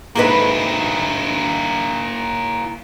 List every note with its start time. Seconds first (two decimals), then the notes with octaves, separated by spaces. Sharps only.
0.15 G#2 A#3 E4 G#4 B4